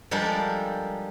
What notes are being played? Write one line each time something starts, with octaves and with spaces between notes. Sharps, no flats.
F3 G3 G#3 D4 A4 A#4